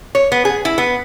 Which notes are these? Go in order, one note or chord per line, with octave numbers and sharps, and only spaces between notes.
C#5
B3
G#4
E4
B3